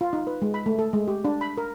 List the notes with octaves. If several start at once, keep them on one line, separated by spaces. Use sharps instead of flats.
F4
D#4
B4
G#3
B5
A3
A4
G#3
G4
D4
B5
A#4